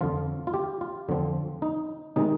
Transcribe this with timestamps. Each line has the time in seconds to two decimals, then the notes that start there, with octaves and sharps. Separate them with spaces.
0.01 F2 D3 F3 F4
0.47 F4
0.54 G4
0.81 F4
1.09 F2 D3 F3 C4
1.62 D#4
2.16 C3 D#3 G#3 D#4